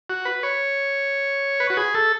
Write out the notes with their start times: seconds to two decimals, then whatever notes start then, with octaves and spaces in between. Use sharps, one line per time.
0.10 F#4
0.25 B4
0.43 C#5
1.60 B4
1.70 F#4
1.77 G#4
1.94 A4